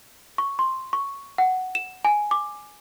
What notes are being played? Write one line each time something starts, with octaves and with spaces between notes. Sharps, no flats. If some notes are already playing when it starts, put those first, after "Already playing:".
C#6
C6
C#6
F#5
E7
G#5
D6